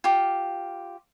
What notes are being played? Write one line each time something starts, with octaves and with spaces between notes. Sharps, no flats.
F4 G4